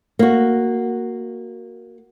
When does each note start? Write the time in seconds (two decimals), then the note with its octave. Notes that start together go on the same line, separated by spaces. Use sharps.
0.19 A#3 F#4